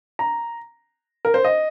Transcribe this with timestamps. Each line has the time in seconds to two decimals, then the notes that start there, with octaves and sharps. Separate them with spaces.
0.19 A#5
1.25 A#4
1.34 C5
1.44 D#5